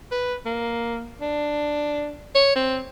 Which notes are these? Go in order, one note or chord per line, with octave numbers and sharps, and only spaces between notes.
B4
A#3
D4
C#5
C4